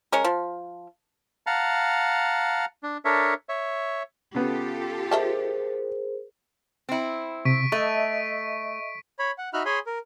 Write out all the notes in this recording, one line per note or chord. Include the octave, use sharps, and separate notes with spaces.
G#3 C#4 A#4
F3
F5 F#5 A5 A#5
D4
D4 A4 A#4 C#5 E5
C#5 E5
C#3 B3 F4 G4 A4
G#4 A#4 C5 D#5 E5 A5
C4 E4
C3 C#6 B6 D7
A3 D#5 E5 C#6
C#5 B5
F#5
D#4 F#4 E5 B5 F6 F#6
G#4 C#5 G#5 B5 C6
A#4